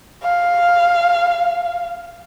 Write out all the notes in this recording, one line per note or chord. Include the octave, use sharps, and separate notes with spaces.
F5